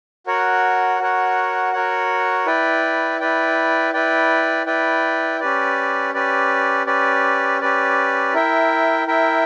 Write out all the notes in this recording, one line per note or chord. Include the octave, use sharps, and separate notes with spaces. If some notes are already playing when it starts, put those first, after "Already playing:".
F#4 A#4 C#5 F#5
F#4 A#4 C#5 F#5
F#4 A#4 C#5 F#5
E4 B4 D5 G5
E4 B4 D5 G5
E4 B4 D5 G5
E4 B4 D5 G5
C#4 G4 B4 D5
C#4 G4 B4 D5
C#4 G4 B4 D5
C#4 G4 B4 D5
E4 A#4 E5 G5
E4 A#4 E5 G5